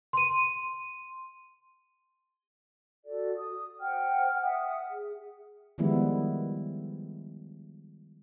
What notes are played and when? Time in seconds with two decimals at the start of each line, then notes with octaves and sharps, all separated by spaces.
0.13 C6 D#7
3.05 F#4 A4 D5
3.37 D#6
3.80 C5 F#5 G5 F6
4.43 E5 F#5 D#6
4.89 G#4
5.78 D#3 F3 G3 G#3 B3 E4